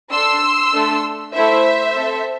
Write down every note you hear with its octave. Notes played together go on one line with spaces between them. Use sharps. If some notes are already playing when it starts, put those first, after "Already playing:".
D4 A4 C6 E6
A3 D4 A4
A3 E4 A4 C5 E5
C4 A4